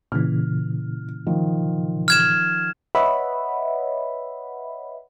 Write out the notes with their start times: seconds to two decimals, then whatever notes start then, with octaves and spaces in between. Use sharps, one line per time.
0.12 A#2 C#3 E3 F6
1.27 D#3 F3
2.08 F6 G#6 E7
2.95 B4 C#5 D#5 E5 F#5 B5